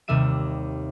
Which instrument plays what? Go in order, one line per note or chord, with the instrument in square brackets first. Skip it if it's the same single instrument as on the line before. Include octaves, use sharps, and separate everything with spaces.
[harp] D#2 C3 G3 E5 D#7